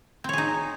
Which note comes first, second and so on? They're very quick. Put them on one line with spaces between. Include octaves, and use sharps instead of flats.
C4 C#5 G#4 D#4